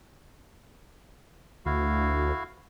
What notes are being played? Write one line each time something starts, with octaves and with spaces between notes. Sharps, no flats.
D2 E4 F#4 F5